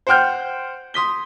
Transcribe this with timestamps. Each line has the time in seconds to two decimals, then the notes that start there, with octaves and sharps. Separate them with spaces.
0.07 C5 F#5 G5 F6 G6
0.94 C6 D#6 B6 G7